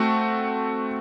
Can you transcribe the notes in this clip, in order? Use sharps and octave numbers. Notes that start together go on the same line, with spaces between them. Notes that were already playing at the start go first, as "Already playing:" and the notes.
Already playing: A3 C4 F#4